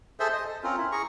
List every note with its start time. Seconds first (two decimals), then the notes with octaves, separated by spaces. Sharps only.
0.20 G#4 A4 C5 E5
0.33 D#5
0.48 A4
0.63 C4 C#4 F4 A#4
0.77 E4
0.92 G#4 A#5 C#6